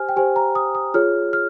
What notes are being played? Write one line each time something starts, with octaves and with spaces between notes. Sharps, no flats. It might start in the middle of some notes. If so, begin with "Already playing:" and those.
Already playing: G4 C5 G#5 F6
G5
G4 C5 G#5
A#5
D#6
D#6
F4 G#4 C#5 F6
F6